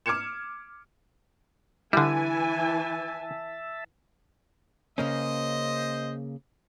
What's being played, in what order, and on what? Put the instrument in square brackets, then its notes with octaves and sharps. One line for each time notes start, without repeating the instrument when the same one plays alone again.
[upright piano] D6 F6 G#6 C#7 E7
[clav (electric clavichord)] D3 G3 [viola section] E3 G#5 [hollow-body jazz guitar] E4 [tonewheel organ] E5 A5
[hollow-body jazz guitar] C#3 A#3 C#4 [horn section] C5 D#5